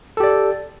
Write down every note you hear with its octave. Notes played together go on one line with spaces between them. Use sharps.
G4 A4 D5